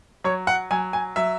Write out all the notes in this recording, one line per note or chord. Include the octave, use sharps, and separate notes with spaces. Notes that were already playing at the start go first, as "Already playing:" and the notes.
F#3 C#5
F#5
F#3 G#5
G#5
F#3 E5